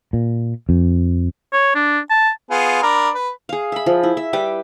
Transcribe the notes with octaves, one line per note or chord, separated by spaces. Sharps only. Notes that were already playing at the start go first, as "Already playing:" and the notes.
A#2
F2
C#5
D4
A5
B3 F4 G#4
D4 A#4 B5
B4
G#4 F5
E5 B5
F3
E4
E5
G3 B4 G5 D6